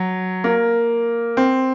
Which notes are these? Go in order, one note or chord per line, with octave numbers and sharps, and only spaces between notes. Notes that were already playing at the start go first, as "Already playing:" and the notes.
Already playing: F#3
A#3
C4